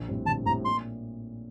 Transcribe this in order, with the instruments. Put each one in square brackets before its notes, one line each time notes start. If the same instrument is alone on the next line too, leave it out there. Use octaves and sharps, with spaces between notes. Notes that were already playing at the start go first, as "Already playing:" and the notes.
Already playing: [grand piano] A#1
A2 G3 C4
[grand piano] A#1 [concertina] A5
[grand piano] A2 G3 C4 [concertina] A#5
[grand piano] A#2 [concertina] C6